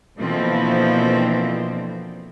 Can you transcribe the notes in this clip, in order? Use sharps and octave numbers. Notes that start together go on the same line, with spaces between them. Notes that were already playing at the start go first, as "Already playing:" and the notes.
B2 D3 E3 F3 A#3 C4